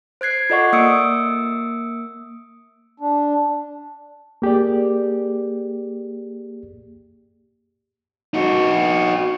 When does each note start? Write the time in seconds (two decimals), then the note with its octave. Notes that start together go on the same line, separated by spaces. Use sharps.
0.21 C5 F#6 G#6 C7
0.50 F4 A4 D5 D#5 F#5 C#6
0.73 A#3 D#6 E6 C#7 D7
3.00 D4
4.42 A#3 G4 G#4 D5
8.34 D#4 F#4